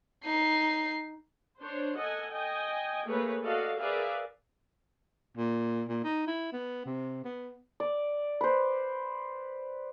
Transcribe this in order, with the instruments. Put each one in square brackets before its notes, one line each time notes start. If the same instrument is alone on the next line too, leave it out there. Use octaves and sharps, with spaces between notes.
[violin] D#4 C7
[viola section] D4 C5 C#5
A4 D#5 F#5 G#5
D#5 G5 G#5
A3 A#3 G#4 B4 C#5
F#4 A4 D5 D#5 F5
G#4 A#4 B4 D5 E5 F5
[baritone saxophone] A#2
A#2
D#4
E4
B3
C3
B3
[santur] D5
B4 C5